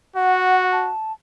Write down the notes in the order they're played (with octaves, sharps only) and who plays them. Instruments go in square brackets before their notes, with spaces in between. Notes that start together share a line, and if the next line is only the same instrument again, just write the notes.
[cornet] F#4 [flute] F#5
[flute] A5